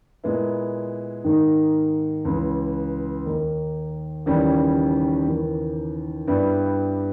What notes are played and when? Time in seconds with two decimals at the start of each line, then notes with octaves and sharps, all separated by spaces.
0.24 A#2 G#3 B3 E4
1.24 G#2 D#3 A#3 D#4
2.25 C#2 C#3 E3
3.25 D#2 D#3 A#3 D#4
4.26 D#2 C#3 E3 G3 C#4
5.26 D#2 C#3 E3 A#3
6.27 G2 G3 B3 E4